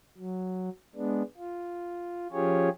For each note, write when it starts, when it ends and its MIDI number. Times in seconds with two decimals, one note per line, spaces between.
0.17 0.69 54
0.96 1.23 56
0.96 1.23 59
0.96 1.23 62
1.37 2.27 65
2.32 2.69 53
2.32 2.69 61
2.32 2.69 65
2.32 2.69 67
2.32 2.69 68
2.32 2.69 73